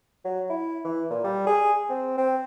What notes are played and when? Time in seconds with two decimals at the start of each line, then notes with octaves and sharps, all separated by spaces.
0.25 F#3
0.50 E4
0.85 E3
1.10 A#2
1.24 G3
1.47 G#4
1.89 C4
2.17 C4